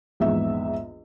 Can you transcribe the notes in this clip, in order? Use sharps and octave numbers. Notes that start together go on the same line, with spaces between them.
A#1 E2 G#2 B3 E5